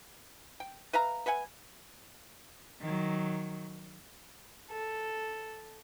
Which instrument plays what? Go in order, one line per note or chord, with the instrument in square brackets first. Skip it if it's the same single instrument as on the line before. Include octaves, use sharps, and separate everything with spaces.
[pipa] G5
B4 E5 F5 A#5
B4 E5 F#5 G#5
[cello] D#3 F#3
[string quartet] A4